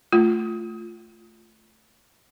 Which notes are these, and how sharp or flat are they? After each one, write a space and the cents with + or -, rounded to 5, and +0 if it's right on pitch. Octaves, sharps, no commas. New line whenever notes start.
A3 +0 F4 -5